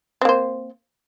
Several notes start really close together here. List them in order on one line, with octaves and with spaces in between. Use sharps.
C4 A#3 C5